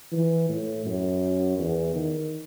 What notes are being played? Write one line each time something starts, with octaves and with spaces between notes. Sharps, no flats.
E3
A2
F#2
E2
D#3